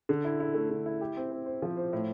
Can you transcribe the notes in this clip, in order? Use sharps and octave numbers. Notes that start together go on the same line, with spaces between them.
D3
E4
E4
A3
D3
E4
G4
C4
C4
C5
F3
C5
A2